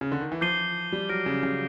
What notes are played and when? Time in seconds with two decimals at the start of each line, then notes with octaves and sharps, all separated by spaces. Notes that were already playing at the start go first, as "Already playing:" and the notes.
0.01 C#3
0.12 D3
0.21 D#3
0.32 E3
0.41 F3 D6 G6 C7 D#7 G7
0.92 G3
1.09 F#3 F6 A#6 D7 G7
1.26 C#3
1.43 C#3